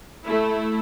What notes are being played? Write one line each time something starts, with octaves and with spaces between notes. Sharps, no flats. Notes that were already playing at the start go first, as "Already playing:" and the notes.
A3 E4